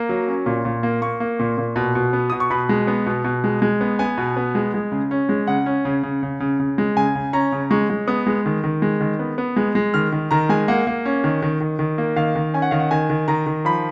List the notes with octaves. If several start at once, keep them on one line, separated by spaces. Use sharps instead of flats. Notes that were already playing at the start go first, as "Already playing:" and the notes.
Already playing: A#3 A#5
F#3
C#4
A#2
A#2
A#3
A#3 C#6
A#3
A#2
A#2
B2
B2
B3
B2 D#6
C#6
B2 B5
G#3
B3
B2
B2
G#3
G#3
B3
B3 G#5
B2
B3
G#3
G#3
C#3
C#4
G#3
C#3 F#5
C#4
C#3
C#3
C#3
C#3
C#3
G#3
C#3 G#5
C#3
C#4 A#5
C#3
G#3 C#6
G#3
B3 D#6
G#3
D#3
D#3
G#3
D#3
B3
B3
G#3
G#3
D#3 F6
D#3
D#3 A#5
G#3 G#5
A#3 F#5
A#3
C#4
D#3
D#3
D#3
D#3
A#3
D#3 F5
D#3
C#4 G#5
F#5
D#3 F5
F#5
D#3 G#5
D#3
D#3 A#5
D#3
F3 B5